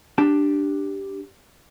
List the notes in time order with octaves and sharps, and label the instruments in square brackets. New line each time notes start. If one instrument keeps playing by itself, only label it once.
[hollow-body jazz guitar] D4 G4 A5